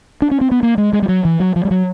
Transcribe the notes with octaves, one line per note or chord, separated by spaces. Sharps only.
D4
C#4
C4
B3
A#3
G#3
G#3
G3
F#3
E3
F#3
F3
G3
F#3